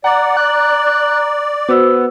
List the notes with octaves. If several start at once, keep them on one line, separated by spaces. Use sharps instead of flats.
D5 F#5 A#5
F#6
B3 F#4 C5 E6